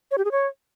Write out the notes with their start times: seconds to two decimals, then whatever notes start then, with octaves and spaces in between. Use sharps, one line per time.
0.11 C#5
0.18 G4
0.25 G#4
0.32 C#5